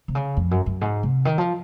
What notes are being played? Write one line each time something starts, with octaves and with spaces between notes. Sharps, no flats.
C3
C#3
F2
F#2
F#2
G#2
C3
D#3
F3